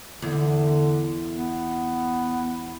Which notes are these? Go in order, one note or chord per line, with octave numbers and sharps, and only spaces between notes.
E2 D3
B3